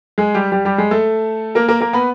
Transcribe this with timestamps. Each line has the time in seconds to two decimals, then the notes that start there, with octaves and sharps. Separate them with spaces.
0.18 G#3 G#4
0.34 G3 G4
0.52 G3 G4
0.65 G3 G4
0.78 G#3 G#4
0.91 A3 A4
1.55 A#3 A#4
1.69 A#3 A#4
1.81 A#3 A#4
1.93 B3 B4